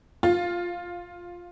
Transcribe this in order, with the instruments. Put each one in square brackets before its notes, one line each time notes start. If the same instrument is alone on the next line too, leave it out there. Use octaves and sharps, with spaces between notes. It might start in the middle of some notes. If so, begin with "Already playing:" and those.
[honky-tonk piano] F4